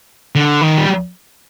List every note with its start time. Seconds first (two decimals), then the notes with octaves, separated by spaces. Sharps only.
0.35 D3
0.61 D#3
0.77 G3